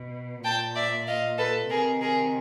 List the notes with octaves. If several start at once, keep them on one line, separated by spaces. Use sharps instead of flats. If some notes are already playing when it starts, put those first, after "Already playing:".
Already playing: B2
A#2 G5 A5
D5 E5
D#5 F5
A4 B4
C3 D#3 G#4 A#4
G#4 A#4